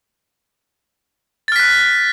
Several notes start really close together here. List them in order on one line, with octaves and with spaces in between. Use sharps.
A6 F6 B6 F#6